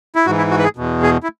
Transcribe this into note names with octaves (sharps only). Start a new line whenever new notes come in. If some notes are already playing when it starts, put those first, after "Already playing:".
E4
G#2 E3 F#4
E4
F#4
B4
G#4
E2 B2
G#4
E4